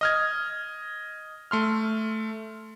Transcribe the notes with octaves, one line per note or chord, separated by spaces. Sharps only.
D#5 F6 G#6
A3 C6 F6